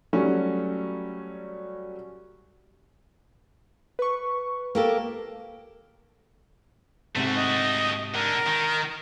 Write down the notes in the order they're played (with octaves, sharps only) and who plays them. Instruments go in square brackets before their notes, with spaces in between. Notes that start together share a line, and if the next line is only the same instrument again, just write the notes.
[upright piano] F#3 G3 A3 C#4 F#4
[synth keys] B4 C#6
[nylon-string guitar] A#3 G4 A4
[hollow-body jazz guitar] G#2 C3 [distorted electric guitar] A3 F#4
[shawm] D#5
[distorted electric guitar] D3 [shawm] A#4
[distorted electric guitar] D#3